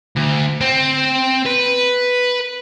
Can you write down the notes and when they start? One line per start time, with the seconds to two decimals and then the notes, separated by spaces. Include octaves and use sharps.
0.16 D2
0.61 C4
1.46 B4